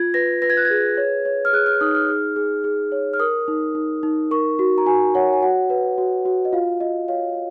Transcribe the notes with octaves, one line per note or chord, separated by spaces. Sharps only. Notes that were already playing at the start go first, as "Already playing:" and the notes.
Already playing: F4 G#6
B4 A#6
B4 A#6
G#6
F#6
G#6
G#4
C#5
C#5
F6
G#4 F#6
F6
D#4 D#6
F6
G#4
G#4
G#4
C#5
F6
A#4 D#6
D#4
D#4
D#4
A#4 C#6
F#4
A#5
F#4 G#5
C#5 F#5
G#5
F#4 F#5
B4
F#4
F#4
D#5
F4 F5
F4 D#5
C#5 F5